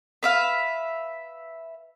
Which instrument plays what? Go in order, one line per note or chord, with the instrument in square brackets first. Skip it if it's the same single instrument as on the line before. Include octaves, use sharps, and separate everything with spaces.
[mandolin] B4 E5 F5